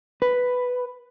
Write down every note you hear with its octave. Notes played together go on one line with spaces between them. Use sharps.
B4